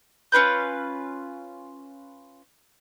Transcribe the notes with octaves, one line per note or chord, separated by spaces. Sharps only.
C#4 F4 B4 G6